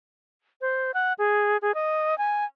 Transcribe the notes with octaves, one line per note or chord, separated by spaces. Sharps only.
C5
F#5
G#4
G#4
D#5
G#5